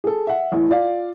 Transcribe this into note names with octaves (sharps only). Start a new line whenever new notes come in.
G#4 A4
E5 F#5
A1 E2 A2
F4 D5 F5